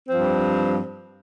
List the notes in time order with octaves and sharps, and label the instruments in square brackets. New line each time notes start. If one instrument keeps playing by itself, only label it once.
[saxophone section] G2 F3 C4